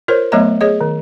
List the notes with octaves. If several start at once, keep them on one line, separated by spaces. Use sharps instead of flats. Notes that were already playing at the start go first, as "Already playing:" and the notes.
F4 A#4 C5 C#5
F#3 A3 B3 C#5 D#5 A#5
G#4 C#5 D#5
D#3